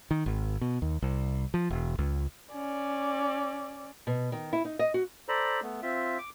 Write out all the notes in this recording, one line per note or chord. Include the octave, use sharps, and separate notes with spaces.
D#3
G#1
B2
D#2
C2
F3
E1
C#2
C#4 D5
B2
D#3
E4
D#4
D#5
F#4
A4 C5 D5 A#5 B5
A3 B3
C4 F4 E5
D6